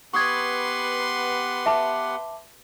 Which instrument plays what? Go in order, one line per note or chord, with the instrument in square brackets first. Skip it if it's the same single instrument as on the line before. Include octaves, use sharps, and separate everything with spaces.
[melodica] B3 G4 F#5 [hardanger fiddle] B4 C6 [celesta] C#6 D#6 G#6
[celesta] E5 A5 D6